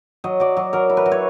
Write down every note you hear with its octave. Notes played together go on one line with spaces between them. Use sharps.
F#3 D#5
F#3 D5
F#3
F#3 A#4
E4
B4
F#3
C#5